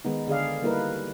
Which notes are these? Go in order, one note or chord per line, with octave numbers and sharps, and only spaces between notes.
D#3 G#3 B3 D#4
D3 G#4 D5 F5
G3 A#3 D#4 E4 A#4 B4